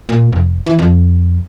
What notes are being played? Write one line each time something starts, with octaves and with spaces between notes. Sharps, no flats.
A#2
F1
E3
F2